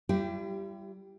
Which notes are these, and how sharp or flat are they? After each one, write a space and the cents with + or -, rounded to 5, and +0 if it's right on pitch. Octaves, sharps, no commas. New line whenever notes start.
G3 -10 E4 +45 G4 +0